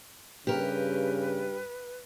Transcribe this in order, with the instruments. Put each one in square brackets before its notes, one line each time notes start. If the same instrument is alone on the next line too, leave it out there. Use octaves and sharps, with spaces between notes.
[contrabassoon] G2 [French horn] C#3 [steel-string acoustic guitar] G4 A#4 [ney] B4